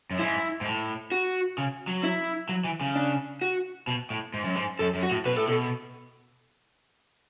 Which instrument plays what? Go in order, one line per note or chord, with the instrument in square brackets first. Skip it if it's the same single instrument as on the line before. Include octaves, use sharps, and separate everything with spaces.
[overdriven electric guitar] F#2
[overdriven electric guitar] G#2 [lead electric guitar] E4
[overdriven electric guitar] G#2
A2
[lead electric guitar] F#4
[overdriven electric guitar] C#3
F#3
[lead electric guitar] E4
[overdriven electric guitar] F#3
E3
C#3
[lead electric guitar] D4
F#4
[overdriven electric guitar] B2
A2
G#2
F#2
G#2
[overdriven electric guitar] F#2 [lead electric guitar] A4
[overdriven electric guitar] F#2
[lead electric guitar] F#4
[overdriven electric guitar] A2
[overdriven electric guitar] B2 [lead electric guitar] B4
[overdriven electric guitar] A2 [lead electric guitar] A4
[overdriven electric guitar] B2 [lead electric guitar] A4